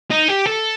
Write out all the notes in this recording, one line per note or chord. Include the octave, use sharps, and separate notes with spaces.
D#4
G4
A4